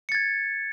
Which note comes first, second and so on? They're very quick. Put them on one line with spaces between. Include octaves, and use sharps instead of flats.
C#7 A6 G#6